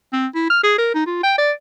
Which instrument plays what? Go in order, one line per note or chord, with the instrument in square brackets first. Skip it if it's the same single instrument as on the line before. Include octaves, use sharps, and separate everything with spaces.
[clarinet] C4
E4
F6
G#4
A#4
D#4
F4
G5
D5